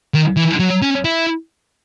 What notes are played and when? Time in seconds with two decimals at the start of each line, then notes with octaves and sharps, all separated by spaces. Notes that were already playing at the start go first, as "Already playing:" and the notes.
0.14 D#3
0.37 E3
0.59 F#3
0.82 C#4
1.05 E4